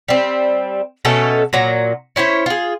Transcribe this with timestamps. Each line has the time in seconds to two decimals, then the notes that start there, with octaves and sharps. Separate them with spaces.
0.08 G3 C4
1.05 B2 A3 C#4 A4
1.53 A#2 F#3 A#5
2.16 C#4 E4 C5 C#5
2.46 F4 G#4